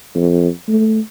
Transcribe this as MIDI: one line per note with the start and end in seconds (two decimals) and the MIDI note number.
0.15 0.48 41
0.68 1.00 57